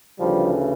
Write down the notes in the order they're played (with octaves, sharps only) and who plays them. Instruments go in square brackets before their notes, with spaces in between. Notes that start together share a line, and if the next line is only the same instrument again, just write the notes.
[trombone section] D2 C#3 E3 F3 G3